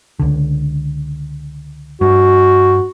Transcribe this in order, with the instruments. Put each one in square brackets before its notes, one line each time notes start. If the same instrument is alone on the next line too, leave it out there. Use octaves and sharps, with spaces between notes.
[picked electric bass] C#2 D3
[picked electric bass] G2 [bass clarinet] F#4